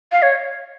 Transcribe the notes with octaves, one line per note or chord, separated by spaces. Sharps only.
F5
C#5